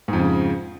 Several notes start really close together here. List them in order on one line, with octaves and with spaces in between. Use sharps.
G#2 F2 C#3